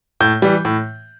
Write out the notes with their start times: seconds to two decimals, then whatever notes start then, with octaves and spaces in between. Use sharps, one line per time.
0.20 A2 G6
0.42 E3 G3
0.65 A2